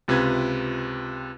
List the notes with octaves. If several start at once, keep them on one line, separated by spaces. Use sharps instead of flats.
C#2 C3 F4 B4 G#6